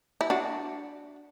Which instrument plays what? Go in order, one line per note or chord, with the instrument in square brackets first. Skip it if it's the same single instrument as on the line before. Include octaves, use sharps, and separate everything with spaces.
[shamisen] E4
D4 F#4